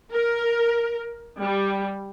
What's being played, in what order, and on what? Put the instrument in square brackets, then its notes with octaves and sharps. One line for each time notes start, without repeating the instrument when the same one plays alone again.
[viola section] A#4
G3